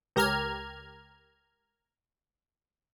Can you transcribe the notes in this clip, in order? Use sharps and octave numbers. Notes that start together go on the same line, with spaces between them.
C#2 G4 A#4 A#5 F6 G#6